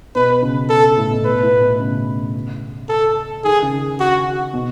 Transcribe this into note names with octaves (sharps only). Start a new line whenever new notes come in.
B2 B4
C#3
A4
A2
B2
B4
A2
B2
C#3
A4
D#3 G#4
C#3
F#4
B2